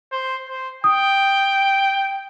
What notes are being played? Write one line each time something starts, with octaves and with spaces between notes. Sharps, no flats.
C5
C5
G5 D#6